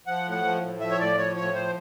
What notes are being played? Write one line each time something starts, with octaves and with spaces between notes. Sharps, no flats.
F3 F#5
A2
F#5
F3
A2
F3 E5
C#5
A2 D5
F3 C#5
A2 C#5
F3 C5